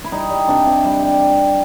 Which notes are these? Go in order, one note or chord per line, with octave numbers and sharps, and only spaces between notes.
E4
G3 D#4
G3
C3 D4
C3
G3
G3